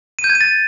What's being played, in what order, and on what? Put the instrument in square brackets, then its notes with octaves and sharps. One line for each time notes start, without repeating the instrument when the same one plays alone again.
[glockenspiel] D#7
G6
G#6
D#7
A6